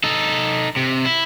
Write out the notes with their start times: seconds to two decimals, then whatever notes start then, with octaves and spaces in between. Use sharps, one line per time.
0.04 D#4 A4
0.76 C3
1.05 E4